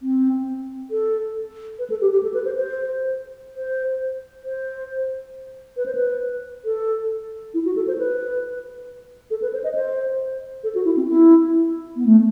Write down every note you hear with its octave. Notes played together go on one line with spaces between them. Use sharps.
C4
A4
B4
A4
G4
G4
A4
B4
C5
C5
C5
C5
B4
C5
B4
A4
E4
F#4
A4
C5
B4
A4
B4
C5
D#5
C5
A4
F#4
E4
C4
E4
B3
A3